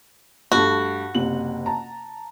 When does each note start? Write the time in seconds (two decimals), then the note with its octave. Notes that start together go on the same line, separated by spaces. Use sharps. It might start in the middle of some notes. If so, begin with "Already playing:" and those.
0.52 G2 A3 F#4
1.15 F#1 C3 F#7
1.66 A5 A#5